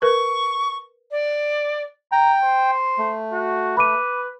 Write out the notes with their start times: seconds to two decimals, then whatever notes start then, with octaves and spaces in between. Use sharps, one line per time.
0.02 A#4 B4 C#6
1.11 D5
2.12 G5 A#5
2.43 C5
2.98 A3
3.33 F#4
3.77 B4 B5 D6 D#7